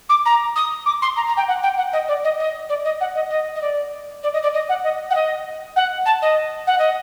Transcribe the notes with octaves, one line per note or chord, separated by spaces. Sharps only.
D6
A#5
D#6
D6
C6
A#5
A#5
G5
F#5
G5
F#5
D#5
D5
D#5
D#5
D5
D#5
F#5
D#5
D#5
D#5
D5
D5
D#5
D5
D#5
F#5
D#5
F#5
D#5
F#5
A5
D#5
F#5
D#5